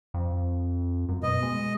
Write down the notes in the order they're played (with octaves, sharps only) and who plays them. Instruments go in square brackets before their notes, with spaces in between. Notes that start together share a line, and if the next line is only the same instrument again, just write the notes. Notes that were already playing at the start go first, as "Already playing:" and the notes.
[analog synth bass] F2
F#2
[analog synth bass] B2 [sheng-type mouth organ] D#5
[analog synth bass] G#3